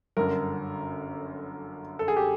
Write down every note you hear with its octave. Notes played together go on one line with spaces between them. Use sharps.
G1 F#2 D3 A#4
A4
G#4
G4